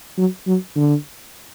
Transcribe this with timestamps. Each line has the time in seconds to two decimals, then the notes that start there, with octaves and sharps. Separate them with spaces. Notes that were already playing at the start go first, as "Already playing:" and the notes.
0.18 F#3
0.47 F#3
0.76 D3